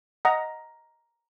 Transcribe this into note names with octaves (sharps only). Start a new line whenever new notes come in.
D#5 F#5 A#5 D#6